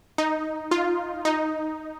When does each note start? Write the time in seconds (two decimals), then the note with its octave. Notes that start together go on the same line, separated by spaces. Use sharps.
0.18 D#4
0.71 F4
1.25 D#4